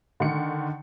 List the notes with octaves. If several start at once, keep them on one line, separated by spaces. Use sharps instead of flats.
D3 D#3 C#7